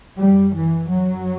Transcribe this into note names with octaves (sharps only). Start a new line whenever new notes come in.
F#2 G3
E3
F#2 F#3